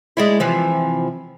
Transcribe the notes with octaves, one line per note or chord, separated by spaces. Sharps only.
G#3 D4 E4
C3 E3 F3